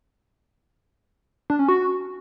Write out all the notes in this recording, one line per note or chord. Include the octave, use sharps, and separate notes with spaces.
D4
C#4
F#4